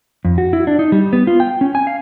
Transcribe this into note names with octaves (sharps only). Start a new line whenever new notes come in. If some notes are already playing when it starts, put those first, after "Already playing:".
F2
F#4
E4
D4
D#4
G3
B3
F4
G5
C#4
G#5
F5